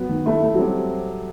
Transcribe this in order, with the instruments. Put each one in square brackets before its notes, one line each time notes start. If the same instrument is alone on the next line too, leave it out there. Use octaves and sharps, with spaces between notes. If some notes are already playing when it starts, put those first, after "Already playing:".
Already playing: [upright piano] F#3 [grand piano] B3
[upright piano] D#3
[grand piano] A3 [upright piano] E4
[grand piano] A3 [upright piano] A4
[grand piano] F#3
[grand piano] G3 [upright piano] C4